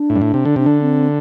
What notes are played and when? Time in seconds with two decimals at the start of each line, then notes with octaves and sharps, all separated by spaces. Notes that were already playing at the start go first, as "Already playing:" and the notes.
Already playing: D4
0.10 A2
0.16 G2
0.22 A2
0.34 C3
0.45 D3
0.56 C3 D4
0.66 D3
0.81 C4